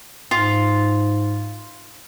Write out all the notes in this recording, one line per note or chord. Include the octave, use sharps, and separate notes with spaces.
G#2 F4